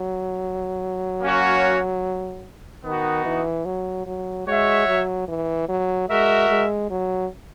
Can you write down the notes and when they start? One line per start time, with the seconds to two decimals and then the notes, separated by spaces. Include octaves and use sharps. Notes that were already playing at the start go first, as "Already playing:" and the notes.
Already playing: F#3
1.22 A#3 C#4 F#4 C#5
2.85 D#3 B3 D#4 F#4
3.26 E3
3.66 F#3
4.07 F#3
4.47 G#3 F#4 C#5 E5
4.88 F#3
5.28 E3
5.68 F#3
6.09 G#3 F#4 A#4 E5
6.50 G#3
6.90 F#3